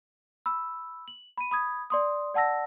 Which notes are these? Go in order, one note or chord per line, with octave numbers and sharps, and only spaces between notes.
B5 E6
F#7
B5 D#7
B5 D#6 G#6
D5 C6 D#6
D5 F#5 A5 E6 A#6